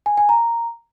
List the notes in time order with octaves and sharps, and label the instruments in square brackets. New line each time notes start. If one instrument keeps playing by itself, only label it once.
[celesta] G#5
G#5
A#5